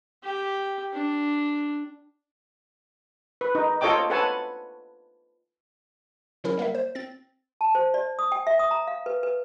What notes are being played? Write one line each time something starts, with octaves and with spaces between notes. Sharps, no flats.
G4
D4
B4
D#4
F4 A4 C#5 D#5 G5 D6
A4 B4 C#5 F#5 G#5 A5
C#3 F#3 C#4 E4 A#4
G3 A#3 A#4 E5
C5
C4 A6
A5
C5
D5
D#6
G5
E5
D#6
A#5
F5
B4
B4